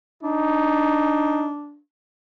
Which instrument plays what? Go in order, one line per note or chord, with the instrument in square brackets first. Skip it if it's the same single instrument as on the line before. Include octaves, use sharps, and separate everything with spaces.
[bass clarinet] D4 [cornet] D#4